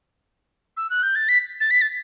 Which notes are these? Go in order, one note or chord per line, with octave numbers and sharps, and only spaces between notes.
E6
F#6
G6
A6
B6
A6
B6
A6